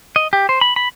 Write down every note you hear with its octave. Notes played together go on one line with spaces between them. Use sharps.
D#5
G4
C5
B5
B5